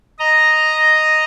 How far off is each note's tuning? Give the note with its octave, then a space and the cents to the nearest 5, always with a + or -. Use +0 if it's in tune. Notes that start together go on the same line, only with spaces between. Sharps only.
D#5 -5 A#5 +0